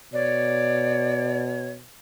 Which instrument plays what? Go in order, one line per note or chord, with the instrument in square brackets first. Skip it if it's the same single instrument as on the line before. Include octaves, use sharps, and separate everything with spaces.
[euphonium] B2 [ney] C#5 [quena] D5